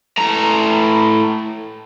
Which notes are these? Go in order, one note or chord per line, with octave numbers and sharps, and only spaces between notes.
A2 A#5